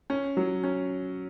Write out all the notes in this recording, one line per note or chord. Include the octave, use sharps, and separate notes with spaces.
C#4
F#3
C#4